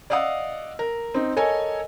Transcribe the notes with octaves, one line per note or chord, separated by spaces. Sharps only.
D5 D#5 F5 F#5 D#6 E6
A#4
C4 D#4
A4 A#4 C#5 D#5 G#5